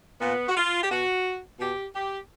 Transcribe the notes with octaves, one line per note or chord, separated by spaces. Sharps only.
A#2 B3
F#4
F4
G4
B2 F#4
B2 G4
G4